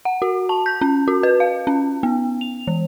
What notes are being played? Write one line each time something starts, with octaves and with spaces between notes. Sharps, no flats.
F#5
F#4
A5
G6
C#4
F#4
B4
F5
C#4
B3
F7
E3